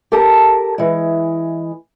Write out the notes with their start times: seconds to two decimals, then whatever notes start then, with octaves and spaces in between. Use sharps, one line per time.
0.12 G4 A4 A#4 A5
0.78 E3 G#3